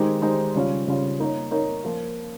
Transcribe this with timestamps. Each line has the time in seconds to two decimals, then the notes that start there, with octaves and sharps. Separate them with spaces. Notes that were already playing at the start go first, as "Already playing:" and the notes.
Already playing: D#3 G#3 D#4 G4 C5
0.22 D#3 G#3 D#4 G4 C5
0.55 C#3 G3 C#4 F4
0.87 C#3 G3 C#4 F4
1.20 A#3 D#4 A#4 C#5
1.51 A#3 D#4 A#4 C#5
1.84 F3 A#3 F4